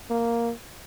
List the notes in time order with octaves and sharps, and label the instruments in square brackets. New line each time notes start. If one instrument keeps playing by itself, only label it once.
[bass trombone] A#3